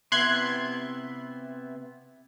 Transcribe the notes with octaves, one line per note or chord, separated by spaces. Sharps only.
C3 B3 E4 C6 F#6 G#6